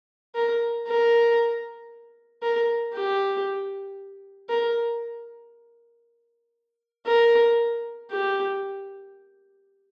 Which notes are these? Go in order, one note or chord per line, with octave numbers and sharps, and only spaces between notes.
A#4
A#4
A#4
G4
A#4
A#4
G4